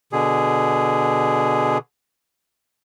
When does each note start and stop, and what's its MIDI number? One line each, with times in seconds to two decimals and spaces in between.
0.12 1.78 47
0.12 1.78 50
0.12 1.78 68